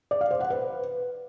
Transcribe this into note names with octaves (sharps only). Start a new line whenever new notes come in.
D5
F5
C5
F#5
B4